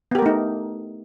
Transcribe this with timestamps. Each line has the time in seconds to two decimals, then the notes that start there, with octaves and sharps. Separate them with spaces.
0.11 B3
0.15 G4
0.19 A#4
0.22 A3
0.26 D#4